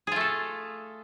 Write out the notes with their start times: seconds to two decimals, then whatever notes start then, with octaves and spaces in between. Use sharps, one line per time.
0.07 G#4
0.12 F4
0.16 A3
0.21 A4